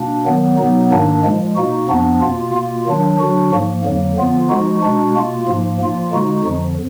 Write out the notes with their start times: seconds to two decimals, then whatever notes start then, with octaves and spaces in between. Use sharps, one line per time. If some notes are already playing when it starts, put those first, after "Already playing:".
Already playing: B2 A#3 D4
0.25 D#3 F#3 B3
0.58 B2 F#3 B3 D#4
0.90 G#2 D#3 A#3 D4
1.23 A#2 F3 G#3
1.55 B2 A#3 D#4 F#4
1.88 F2 F3 B3 D4
2.21 B2 A#3 F4
2.54 B2 A#3 F4
2.86 D#3 F#3 D4
3.19 D3 F#3 D4 F#4
3.51 G#2 F3 A#3
3.84 F2 D3 F#3 A#3
4.17 D3 F3 B3 F4
4.49 F3 G#3 D#4 F#4
4.82 B2 G#3 D4 F#4
5.14 B2 A#3 F4
5.47 G#2 F3 A#3
5.80 A#2 F3 A#3 F4
6.12 D3 G#3 D#4 F#4
6.45 F2 D3 F3